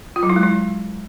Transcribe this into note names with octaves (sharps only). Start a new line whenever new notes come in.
F4
F#3
E4
G#3
E4